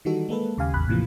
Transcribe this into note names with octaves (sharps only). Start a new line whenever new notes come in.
D#3 E3 G3 D#4 F#4 A4
G#3 A#3 A4 B4
D#2 C#3 G4 F5 G#5
A1 E2 B5 F#6
A2 C3 E3 F3 A#3